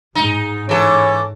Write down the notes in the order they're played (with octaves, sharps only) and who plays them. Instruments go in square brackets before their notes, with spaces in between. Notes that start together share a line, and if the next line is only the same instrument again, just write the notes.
[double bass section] G#2 [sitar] D#4
[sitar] E3 A4 [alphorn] C#4